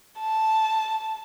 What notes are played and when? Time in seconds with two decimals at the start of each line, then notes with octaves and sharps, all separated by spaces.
0.20 A5